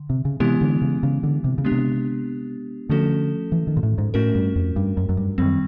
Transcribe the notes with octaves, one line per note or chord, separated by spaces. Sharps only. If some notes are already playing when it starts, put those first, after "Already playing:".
Already playing: D3
C3
C#3
C3 E3 G#3 B3 E4 G4
D3
C#3
C#3
D3
C3
C#3
G#3 B3 D4 G4
C3
D3 F3 A3 C#4 F#4 A4
E3
D#3
A#2
A2
G#2
A2 A3 C#4 F#4 A#4
G2
F2
G2
F#2
F#2
G2
F#2 D#3 G3 C4